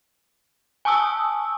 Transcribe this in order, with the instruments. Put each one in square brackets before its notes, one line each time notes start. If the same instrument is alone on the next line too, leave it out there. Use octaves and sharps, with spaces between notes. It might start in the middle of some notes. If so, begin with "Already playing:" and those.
[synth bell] G#5 A5 C#6 D#6 E6